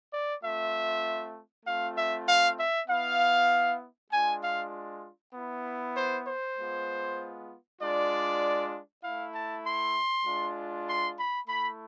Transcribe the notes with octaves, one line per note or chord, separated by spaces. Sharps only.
D5
A3 C4 F4 E5
A3 C4 F4 F5
E5
F5
E5
B3 E4 F5
G#3 D4 F4 G#5
F5
B3 E4
C5
C5
G#3 B3 F4
G#3 D4 F4 D5
A3 E4 F5
A5
C6
G#3 D4 F4
C6
B5
A3 E4 B5